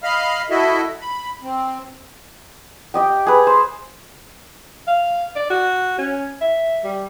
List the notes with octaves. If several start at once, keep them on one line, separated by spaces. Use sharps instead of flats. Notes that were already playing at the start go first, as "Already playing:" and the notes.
D#5 F5 B5 F6
E4 F#4 A4 D#5 E5
B5
C4
G4 D#5 G5
G#4 B4
C5
F5
D5
F#4
C#4
E5
G3